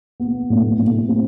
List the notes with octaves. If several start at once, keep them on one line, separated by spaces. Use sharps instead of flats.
B3
A2
A2
C4